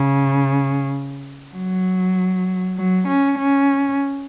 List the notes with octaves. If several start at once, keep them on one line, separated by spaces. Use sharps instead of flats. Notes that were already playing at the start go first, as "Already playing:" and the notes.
Already playing: C#3
F#3
F#3
C#4
C#4